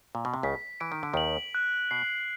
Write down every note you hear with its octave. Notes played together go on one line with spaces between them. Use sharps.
A#2
B2
C3
C#2 C#3 B6
E3 D7
D#3
D3
D#2 D#3 F#7
F#6
B2 C7